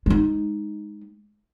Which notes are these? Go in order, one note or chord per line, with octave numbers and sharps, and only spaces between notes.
G#3 D#4